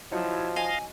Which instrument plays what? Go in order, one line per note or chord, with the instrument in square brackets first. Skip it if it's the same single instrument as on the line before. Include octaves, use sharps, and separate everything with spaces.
[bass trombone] F3 [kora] F#3 D#4 [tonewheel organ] E4
[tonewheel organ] D#5 F5 [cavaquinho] G#5